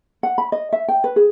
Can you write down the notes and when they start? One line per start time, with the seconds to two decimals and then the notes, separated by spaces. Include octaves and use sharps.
0.23 F#5
0.38 B5
0.52 D#5
0.73 E5
0.88 G5
1.04 B4
1.16 G#4